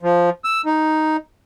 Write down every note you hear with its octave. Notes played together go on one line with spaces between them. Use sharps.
F3
E6
D#4